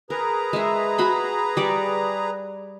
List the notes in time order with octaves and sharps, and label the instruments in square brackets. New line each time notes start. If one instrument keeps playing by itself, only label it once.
[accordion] G#4 B4 A#5 [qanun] A#4
[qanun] G#3 E5
F#4 B5 C6
G3 D5